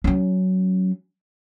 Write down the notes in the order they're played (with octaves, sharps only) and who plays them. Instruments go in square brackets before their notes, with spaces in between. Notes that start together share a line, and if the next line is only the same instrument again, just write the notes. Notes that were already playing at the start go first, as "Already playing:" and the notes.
[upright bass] F#3 C#4